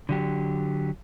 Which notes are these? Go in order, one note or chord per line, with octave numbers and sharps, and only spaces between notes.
D3 F#3 G4